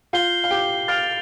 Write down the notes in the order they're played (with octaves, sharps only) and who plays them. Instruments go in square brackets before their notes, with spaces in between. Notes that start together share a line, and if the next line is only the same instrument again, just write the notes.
[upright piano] F4 F5 [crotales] G6 C7 G7
[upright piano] F5
G4 G5
[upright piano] F5 F6 [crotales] A6 D7 F7